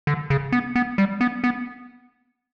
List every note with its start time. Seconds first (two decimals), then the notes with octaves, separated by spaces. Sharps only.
0.07 D3
0.30 C#3
0.52 B3
0.75 B3
0.98 G3
1.21 B3
1.44 B3